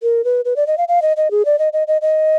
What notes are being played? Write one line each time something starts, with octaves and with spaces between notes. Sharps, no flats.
A#4
B4
B4
D5
D#5
F5
F5
D#5
D#5
G#4
D5
D#5
D#5
D#5
D#5